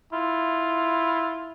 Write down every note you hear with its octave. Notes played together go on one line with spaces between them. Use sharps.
E4 F4